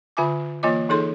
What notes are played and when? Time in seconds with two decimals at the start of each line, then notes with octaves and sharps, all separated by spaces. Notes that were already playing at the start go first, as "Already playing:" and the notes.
0.17 D3 F4 E5 G#5 D6
0.63 E3 A#3 F4 D#5 D6
0.89 E3 D#4 G#4 A4 C6